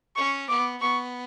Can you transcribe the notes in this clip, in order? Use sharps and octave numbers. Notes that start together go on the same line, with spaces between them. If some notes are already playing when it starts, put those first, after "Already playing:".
C#4 C#6
B3 D6
B3 C#6